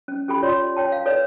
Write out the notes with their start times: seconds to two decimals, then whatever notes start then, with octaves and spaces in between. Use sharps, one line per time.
0.08 C#4
0.28 C#4 G4 A4 G5 B5
0.42 F4 C#5 D5 C6
0.76 C#5 G5 A5
0.92 F5
1.06 A4 B4 C#5 D5